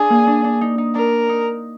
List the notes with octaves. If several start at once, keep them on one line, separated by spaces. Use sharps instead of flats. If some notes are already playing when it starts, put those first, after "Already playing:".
Already playing: D4 G#4
A#3
D4
D4
D#4
D#4
D4 A#4
D#4